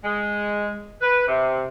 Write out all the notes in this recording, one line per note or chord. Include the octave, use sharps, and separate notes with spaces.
G#3
B4
C3